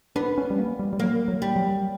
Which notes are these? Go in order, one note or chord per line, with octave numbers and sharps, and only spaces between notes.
B3 D4
C#4
G3
A#3
G3
G3
F#3 A#3
F#3
G3
F#3